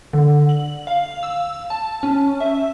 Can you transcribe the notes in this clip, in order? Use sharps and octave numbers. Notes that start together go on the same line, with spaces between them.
D3
F#7
F5
E6
A5
C#4
E5